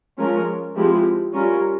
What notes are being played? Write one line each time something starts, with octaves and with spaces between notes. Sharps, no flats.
F3 G#3 C#4 F4 A#4
F3 G#3 C4 E4 G4
G3 C#4 F4 A#4